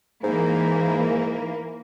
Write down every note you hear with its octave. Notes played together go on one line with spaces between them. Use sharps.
G#2 E3 A#3